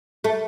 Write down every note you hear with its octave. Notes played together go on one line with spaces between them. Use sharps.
A3